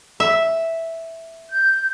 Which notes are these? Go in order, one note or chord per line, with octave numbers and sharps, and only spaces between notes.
E5
G6